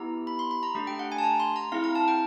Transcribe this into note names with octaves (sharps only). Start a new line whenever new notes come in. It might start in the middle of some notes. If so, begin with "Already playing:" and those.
Already playing: B3 E4 G4 A#5
B5
C6
B5
A#5
A3 D4 G4
G5
F#5
G#5
A5
A#5
C6
A#5
C4 E4 G#4 F5
A#5
A5
G5